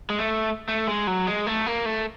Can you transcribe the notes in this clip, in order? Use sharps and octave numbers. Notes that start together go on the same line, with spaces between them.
G#3
A3
A3
G#3
F#3
G#3
A3
A#3
A3